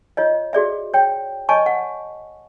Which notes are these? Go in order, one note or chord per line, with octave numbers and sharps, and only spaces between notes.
F4 C#5 D#5
F#4 G#4 D5 E5
C#5 G5
C#5 D#5 G#5 A5 C#6
F#5